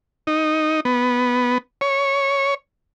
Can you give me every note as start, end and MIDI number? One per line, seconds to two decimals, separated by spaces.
0.27 0.80 63
0.85 1.58 59
1.81 2.54 73